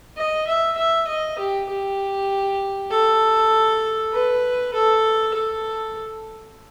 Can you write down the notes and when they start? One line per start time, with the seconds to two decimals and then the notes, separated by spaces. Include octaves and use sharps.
0.17 D#5
0.47 E5
0.78 E5
1.08 D#5
1.39 G4
1.69 G4
2.91 A4
4.13 B4
4.74 A4
5.34 A4